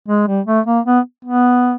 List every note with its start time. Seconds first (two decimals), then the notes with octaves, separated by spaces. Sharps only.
0.09 G#3
0.27 G3
0.47 A3
0.67 A#3
0.86 B3
1.25 B3